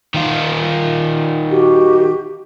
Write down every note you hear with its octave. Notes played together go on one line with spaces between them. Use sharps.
D#3 F4
F#4 G4